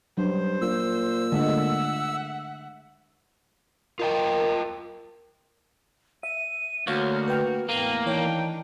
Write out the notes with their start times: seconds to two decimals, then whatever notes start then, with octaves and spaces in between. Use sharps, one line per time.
0.17 G2 F#3 C5
0.62 A#2 E6
1.32 D3 G#3 A3 E5 F#5
3.99 F4 A#4 D#5 G5
6.23 E5 D#7
6.87 D2 A#3 F#4 C#5 F5 C#6 F6
7.28 B4 G5 F6 G6
7.69 E2 A2 A#3 D#7
8.06 D#3 E3 D4 D#4 C#5 G5